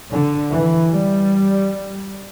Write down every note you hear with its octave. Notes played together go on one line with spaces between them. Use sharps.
D3
E3
G3